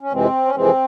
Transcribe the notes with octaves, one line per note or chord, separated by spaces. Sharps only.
C#4
F2 C3 E3 G#3 C4
C#4
F2 C3 E3 G#3 C4